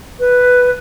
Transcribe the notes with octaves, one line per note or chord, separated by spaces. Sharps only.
B4